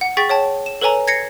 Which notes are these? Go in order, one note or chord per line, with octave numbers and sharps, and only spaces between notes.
F#5
G#4 G5 C#6 A6 B6
C#5 G5 A5
E7
A4 B4 C#5 G#5 A#5
G#6 A#6 C7 C#7